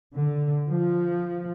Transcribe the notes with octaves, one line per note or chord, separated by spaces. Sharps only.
D3
F3